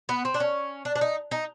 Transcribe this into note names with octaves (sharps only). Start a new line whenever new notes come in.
B3
C4
D4
C#4
D4
D4
D#4
D#4